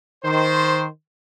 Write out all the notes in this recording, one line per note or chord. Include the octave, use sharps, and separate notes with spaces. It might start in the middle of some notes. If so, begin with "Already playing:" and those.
D#3 C5